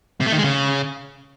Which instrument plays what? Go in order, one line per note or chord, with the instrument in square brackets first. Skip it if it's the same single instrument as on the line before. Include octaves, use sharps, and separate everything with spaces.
[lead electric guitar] C3
A3
D#3
G#3
C#3